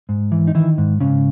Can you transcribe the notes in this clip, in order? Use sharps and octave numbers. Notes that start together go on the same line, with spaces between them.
G#2
E3
D#4
D#3 E3 E4
G#2
G#2 C#3 C#4